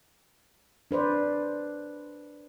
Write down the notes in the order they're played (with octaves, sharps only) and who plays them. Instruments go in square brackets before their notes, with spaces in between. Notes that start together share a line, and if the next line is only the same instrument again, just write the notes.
[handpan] D4 B4 C5 D5